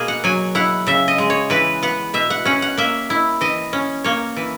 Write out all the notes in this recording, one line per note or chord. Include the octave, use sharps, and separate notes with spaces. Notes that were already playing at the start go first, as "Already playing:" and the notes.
Already playing: B2 A#3 G#4
F#5
F#3 G#5
E4 F#5
C#3 E5
D#5
G#3
C#5
E3 B4
B3 F#5
B2 E5
F#5
C#4 F#5
F#5
A#3 E5
E4
E3 D#5
C#4
A#3 C#5
E3